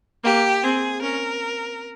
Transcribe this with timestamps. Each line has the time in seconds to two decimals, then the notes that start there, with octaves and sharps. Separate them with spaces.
0.24 A#3 G4
0.63 C4 G#4
1.02 C#4 A#4